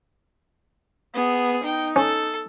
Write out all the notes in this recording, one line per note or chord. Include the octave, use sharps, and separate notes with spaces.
B3 G#4
D#4 G5
C#4 A4